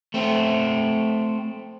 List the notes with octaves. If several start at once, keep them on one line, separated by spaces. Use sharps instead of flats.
A3 C4